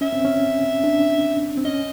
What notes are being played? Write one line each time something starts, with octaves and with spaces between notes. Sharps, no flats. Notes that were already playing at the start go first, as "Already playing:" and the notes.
C#4 E5
C4
C#4
D4
C4
C#4 D#5